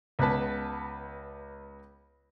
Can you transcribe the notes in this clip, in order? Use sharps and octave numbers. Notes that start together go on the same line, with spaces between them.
C#2 B3 B4 A5